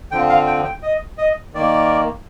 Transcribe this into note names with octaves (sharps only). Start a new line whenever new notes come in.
D3 F3 C4 G5
F5
G5
G5
D#5
D#5
D#3 A#3 D5